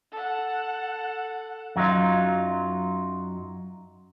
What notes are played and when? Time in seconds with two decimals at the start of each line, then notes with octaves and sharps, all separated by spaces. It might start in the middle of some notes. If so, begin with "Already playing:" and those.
0.12 A4 F#5
1.76 F#2 F#3 D#4 F4